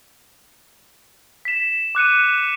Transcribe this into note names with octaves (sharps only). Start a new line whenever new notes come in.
B6 E7
D6 F#6 C#7 D#7